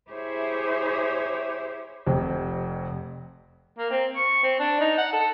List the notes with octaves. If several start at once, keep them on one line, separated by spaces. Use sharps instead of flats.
E4 G4 G#4 C5 C#5 E5
F1 F2 C3
A#3
C4
C#6
C4
D4
D#4
F#5
A4